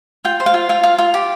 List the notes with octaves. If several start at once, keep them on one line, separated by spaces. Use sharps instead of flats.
F4 G5
C5
F5
F4
F4 F5
F4
F4
G4